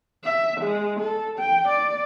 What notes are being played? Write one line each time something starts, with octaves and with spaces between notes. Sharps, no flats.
E5
G#3
A4
G5
D5